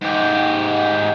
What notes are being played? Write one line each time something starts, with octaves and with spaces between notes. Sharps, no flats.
G#2 G4